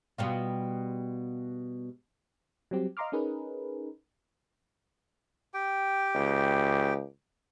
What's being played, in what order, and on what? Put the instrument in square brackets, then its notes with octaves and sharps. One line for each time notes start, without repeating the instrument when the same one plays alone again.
[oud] B2 G3 F4
[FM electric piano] F#3 G3 C4 G4
D#5 F5 A#5 C6 D6 F6
C#4 D#4 G#4 A#4 B4
[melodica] G4 G5
[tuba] C#2